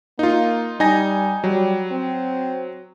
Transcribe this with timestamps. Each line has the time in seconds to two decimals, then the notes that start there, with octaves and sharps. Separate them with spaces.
0.19 A#3 D#4 F4
0.80 G3 D#4 G#5 A#6
1.44 F#3 G3
1.91 C4